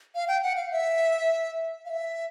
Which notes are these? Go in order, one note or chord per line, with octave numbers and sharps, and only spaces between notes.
F5
G5
F#5
F5
E5
F5
E5